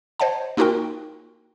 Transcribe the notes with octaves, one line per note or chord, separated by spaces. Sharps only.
C5 C#5 D#5 F#5 A5
A#3 D#4 F4 F#4 A#4 G5